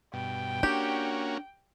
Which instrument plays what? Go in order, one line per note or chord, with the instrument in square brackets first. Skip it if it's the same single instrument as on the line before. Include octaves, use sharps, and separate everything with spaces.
[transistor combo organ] G2 B2 [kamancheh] G5
[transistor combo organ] A#3 C#4 F#4 [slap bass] D4 [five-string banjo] G4